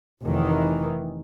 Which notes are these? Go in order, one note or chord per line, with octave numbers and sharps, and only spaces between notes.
F1 D#3 E3